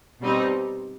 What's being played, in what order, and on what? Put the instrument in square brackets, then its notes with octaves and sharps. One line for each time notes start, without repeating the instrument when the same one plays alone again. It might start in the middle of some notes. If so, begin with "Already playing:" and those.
[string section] B2 G3 C4 D#4